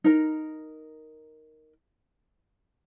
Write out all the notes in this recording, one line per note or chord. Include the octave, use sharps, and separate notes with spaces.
D#4 A#4